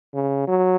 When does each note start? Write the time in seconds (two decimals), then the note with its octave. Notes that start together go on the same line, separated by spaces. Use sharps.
0.14 C#3
0.48 F#3